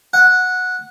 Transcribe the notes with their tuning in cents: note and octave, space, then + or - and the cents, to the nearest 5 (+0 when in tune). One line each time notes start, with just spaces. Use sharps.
F#5 -10